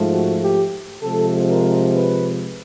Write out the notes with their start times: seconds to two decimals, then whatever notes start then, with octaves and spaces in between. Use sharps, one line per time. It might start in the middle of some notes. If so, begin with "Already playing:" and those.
Already playing: G#2 F3 A3
0.11 F#4
0.42 G4
1.03 C3 F3 G#3 A4
1.49 A#4
1.95 B4